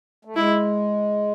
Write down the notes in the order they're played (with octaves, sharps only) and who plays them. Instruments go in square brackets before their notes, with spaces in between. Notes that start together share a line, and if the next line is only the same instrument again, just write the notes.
[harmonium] A3
[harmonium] G#3 [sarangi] E4